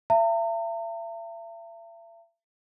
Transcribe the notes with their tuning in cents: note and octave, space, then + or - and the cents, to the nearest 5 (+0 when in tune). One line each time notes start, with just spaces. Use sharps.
E5 +40 A#5 -45